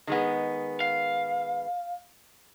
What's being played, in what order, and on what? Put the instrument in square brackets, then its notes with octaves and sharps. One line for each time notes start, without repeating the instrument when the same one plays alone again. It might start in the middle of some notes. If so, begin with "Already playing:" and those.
[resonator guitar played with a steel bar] D#3 G#3 B3
[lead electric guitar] F5